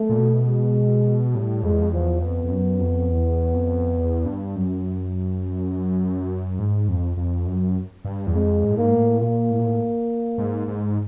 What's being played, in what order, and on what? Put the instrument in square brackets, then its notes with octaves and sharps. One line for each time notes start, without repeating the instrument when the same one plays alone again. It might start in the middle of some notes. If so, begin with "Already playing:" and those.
Already playing: [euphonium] A3
[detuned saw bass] A#2
B2
[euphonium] G#3
[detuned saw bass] A2 [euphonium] G3
[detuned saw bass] F2 [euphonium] G#3
[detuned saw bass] E2
F2
[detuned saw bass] E2 [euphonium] F3
[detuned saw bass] F2 [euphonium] B3
[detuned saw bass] F2
F#2
F2
E2
F2
E2
G2
F#2
G#2
F2
F2
F#2
G2
E2
[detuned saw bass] F2 [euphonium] G#3
[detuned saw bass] G#2
A2
[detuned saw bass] G#2 [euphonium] A#3
[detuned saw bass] A2
[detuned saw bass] A#2 [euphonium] A#3
[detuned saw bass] A2
A#2
A2
G#2
G#2